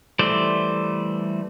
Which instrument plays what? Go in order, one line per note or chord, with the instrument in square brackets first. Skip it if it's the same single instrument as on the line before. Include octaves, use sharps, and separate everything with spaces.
[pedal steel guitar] E3 G3 A3 C5 D5